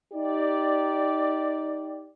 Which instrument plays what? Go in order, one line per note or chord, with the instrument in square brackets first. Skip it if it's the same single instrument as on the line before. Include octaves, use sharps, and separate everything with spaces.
[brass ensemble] D#4 G4 D5